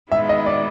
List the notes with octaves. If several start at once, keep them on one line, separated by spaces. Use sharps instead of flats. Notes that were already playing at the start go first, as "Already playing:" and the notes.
D#3 G#3 B3 E4 E5
D#5
D5